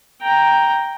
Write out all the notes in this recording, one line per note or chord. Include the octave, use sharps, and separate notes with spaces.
G5 A#5